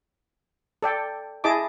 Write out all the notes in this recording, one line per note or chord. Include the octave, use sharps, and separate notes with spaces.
A4 D5 G5
E4 G#4 D#5 A5 D6